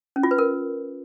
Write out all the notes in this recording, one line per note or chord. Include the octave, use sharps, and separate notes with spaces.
C#4
F4
B4
A#4